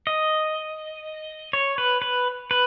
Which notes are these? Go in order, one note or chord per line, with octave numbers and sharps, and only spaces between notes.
D#5
C#5
B4
B4
B4